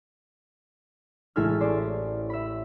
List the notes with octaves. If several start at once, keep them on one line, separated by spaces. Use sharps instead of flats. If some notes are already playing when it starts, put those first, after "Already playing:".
A1 G#3 E4 A4 G#5 F6
C#4 C5 D5 A5
E5 B5